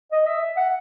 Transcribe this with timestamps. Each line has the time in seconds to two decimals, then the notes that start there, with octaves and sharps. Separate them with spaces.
0.12 D#5
0.26 E5
0.57 F#5